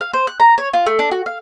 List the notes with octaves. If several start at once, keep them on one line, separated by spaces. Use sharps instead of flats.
F5
C5
F#6
A#5
C#5
F4
A3
D4
F#4
F5